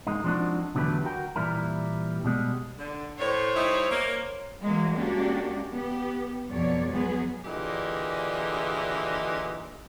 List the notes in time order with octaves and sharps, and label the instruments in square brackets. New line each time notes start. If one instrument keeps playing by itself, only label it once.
[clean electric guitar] G#3 A#3 D#4
F3 G#3 C4 D4 D#4 F#4
E2 D3 F#3 A3 G4 B4
F#4 A#4 G5
A#2 E3 G3 E4 A#4
B2 G3 G#3
[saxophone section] D3
[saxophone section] A2 [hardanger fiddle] C5 C#5
[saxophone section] G3 D#4 E4
A#3
[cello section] E3 F#3 G#3 A#3
G#3 A#3 C#4 D4 F#4 G4
B3 G4
F2 B2 F#3 C#5 D5
F#3 G#3 B3 G#4 B4
[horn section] A#2 D3 E3 G4 G#4 D#5